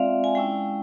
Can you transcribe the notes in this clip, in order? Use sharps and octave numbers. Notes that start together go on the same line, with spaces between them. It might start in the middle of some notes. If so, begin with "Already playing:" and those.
Already playing: G#3 C4 F4 D5 E5 F5
G#5
G#3 C#4 E4 G5